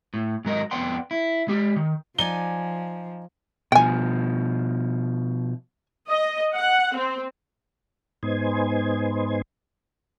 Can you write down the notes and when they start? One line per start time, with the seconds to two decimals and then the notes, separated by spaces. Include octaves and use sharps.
0.14 A2
0.45 G#2 F#3 A#4 D#5
0.71 F2 B3 D5 F#5 G5 C6
1.11 E4
1.48 G#3 G4
1.76 D#3
2.18 F3 D#4 D5 G#5 G7
3.72 B2 F3 G5 G#5
6.08 D#5
6.55 F#5
6.95 C4
8.23 G#2 B3 D#4 C5 G#5